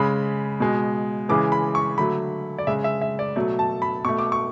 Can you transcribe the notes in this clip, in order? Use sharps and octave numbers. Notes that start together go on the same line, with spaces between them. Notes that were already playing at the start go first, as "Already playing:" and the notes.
Already playing: C#3 G#3 B5
B2 G#3
C#3 E3 G#3 D6
B5
C#6
D3 F#3 A3 B5
D5
C#3 G#3 E5
E5
E5
D5
B2 F#3 A3
A5
B5
B2 A3 C#6
D6
C#6